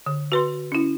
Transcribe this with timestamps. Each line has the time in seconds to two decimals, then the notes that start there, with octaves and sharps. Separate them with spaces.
0.06 D3
0.32 F#4 B4 C6
0.72 C#4 E4